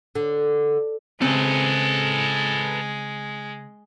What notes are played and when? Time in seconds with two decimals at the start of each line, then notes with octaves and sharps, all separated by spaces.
0.15 D3
1.22 C#3 G#3 C4 A4 B4